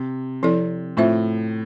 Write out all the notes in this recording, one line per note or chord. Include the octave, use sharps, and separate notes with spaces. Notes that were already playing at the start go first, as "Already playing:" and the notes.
Already playing: C3
F3 C4 E4 A4 D5
A2 C4 F4 C5 E5